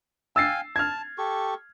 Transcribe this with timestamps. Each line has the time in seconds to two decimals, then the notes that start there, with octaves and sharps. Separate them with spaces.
0.36 F5 G5 G#5 E6 A6 C7
0.76 A5 F6 G#6
1.18 G4 A4 C#6